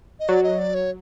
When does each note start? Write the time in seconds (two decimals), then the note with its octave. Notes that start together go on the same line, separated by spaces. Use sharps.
0.20 D#5
0.28 F#3 D5
0.43 D#5
0.59 D5
0.74 C#5